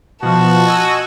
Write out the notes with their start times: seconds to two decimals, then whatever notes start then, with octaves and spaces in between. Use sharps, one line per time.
0.22 B2 F3 F#4 A5
0.67 D#5 G#5 E6